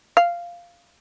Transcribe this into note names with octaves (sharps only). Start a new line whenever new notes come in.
F5